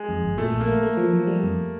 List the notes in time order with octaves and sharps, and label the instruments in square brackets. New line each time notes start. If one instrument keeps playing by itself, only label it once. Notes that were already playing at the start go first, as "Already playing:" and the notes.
Already playing: [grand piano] G#3
[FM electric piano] F2
G1
[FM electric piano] A#2 [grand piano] A3
[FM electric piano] A#1
[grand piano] A#3
[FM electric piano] A3
A3
F3
F3
G3
F2